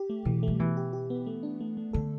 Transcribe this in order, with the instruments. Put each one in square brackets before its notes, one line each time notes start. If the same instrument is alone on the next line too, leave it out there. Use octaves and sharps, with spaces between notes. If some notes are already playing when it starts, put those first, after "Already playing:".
Already playing: [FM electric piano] G4
A3
[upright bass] B2 [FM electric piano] E3
[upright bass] G3 [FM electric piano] A3
[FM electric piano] B2 [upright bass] E3
[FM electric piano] G4
G4
B3
A3
D4
A3
A3
[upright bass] D3 [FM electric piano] A4